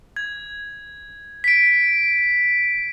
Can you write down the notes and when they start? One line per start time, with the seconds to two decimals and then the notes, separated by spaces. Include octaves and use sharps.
0.16 G#6
1.44 B6 D7